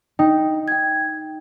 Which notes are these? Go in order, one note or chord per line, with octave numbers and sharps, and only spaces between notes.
D#4 G5
G5 G#6